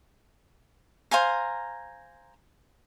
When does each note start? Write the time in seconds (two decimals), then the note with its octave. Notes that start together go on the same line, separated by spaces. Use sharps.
1.11 C5 F5 G#5 A#5